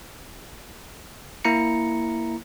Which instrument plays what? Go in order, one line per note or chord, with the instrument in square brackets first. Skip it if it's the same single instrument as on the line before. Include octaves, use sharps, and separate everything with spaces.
[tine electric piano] A#3 E4 A#5 C#7